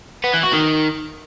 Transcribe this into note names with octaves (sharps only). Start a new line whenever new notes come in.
B3
E3
F#4
D#3